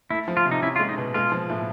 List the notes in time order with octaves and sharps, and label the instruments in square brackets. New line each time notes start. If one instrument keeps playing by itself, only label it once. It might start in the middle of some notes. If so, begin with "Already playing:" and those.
[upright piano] A3 [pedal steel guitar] E4
[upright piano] F3
[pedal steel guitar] F4
[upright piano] C3
[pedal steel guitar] D#4
[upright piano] C#4 [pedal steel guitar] E4
[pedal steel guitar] F4
[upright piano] G#3
[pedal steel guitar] D#4
[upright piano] B2
[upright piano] G#3 [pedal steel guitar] F4
[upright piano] F3
A2